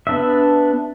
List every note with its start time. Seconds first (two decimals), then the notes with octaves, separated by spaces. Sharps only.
0.07 B3 D4 E5